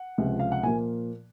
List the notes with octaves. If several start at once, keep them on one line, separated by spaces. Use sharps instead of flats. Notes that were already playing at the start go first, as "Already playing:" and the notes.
Already playing: F#5
C#2 C3 F3
F5
F#5
A#2 F3 A#3 G#5